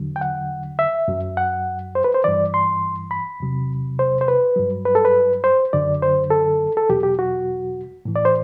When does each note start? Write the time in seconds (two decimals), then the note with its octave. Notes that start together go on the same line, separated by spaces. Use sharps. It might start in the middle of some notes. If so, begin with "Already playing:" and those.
Already playing: E2 D3 F#3
0.16 G5
0.21 F#5
0.79 E5
1.08 F#2 F#3
1.37 F#5
1.95 C5
2.04 B4
2.14 C5
2.24 G2 E3 D5
2.54 C6
3.11 B5
3.40 E2 C3 F#3
3.99 C5
4.21 C5
4.28 B4
4.56 G2 F#3
4.85 B4
4.95 A4
5.05 B4
5.44 C5
5.73 F#2 D3 F#3 D5
6.02 C5
6.31 A4
6.77 A4
6.89 E2 B2 F#3 G4
7.03 G4
7.19 F#4
8.05 A2 E3
8.16 D5
8.25 C5